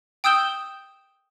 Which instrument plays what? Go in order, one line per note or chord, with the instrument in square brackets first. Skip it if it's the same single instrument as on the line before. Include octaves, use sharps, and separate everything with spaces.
[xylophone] G5 D#6 E6 G6 E7 G7